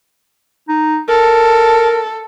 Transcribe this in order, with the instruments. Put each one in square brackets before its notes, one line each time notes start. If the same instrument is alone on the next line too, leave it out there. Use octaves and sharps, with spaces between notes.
[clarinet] D#4
[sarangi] A4 [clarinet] A#4